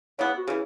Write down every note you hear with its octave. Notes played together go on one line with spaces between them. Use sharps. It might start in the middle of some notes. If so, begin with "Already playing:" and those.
C#3 E3 B3 C#5
F#4
C#3 E3 G#4